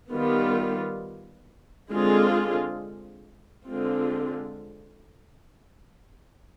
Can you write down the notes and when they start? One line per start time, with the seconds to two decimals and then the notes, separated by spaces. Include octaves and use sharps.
0.12 D#3 G3 B3 F4
1.90 D3 G#3 C4 F4 G#4
3.67 D3 G#3 C4 F4